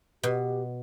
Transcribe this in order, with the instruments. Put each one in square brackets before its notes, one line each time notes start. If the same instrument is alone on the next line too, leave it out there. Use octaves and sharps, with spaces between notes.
[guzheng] B2 [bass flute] G4